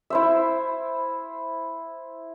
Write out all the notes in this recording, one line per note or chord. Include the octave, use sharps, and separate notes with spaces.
E4 C5 E5